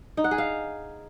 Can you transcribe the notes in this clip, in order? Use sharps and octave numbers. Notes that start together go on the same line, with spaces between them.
D#4
F#5
G#4
F5